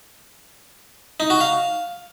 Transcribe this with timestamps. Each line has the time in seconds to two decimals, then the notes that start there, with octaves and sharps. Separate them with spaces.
1.20 D#4
1.30 F#4
1.41 F5